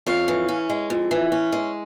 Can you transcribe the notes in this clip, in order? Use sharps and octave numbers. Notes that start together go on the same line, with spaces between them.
F2 C#5 F5
E3
C#4
G#3
F2
E3
C#4
G#3